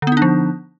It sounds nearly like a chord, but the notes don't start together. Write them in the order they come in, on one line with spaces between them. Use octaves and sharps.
D3 B3 D#4 D4 F3